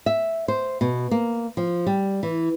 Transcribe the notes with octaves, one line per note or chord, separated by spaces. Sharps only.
E5
C5
B2
A#3
F3
G3
E3